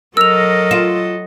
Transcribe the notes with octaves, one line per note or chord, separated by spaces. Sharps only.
F#3 A4 A#4 D#5 E6 F7
F4 E7